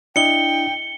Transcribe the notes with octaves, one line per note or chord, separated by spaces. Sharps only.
D4 E4 D#5 G5 C#7 G7